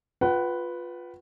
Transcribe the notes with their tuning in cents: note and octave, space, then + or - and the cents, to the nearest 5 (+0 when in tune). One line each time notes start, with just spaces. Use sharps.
F4 +15 B4 +0 F#5 +45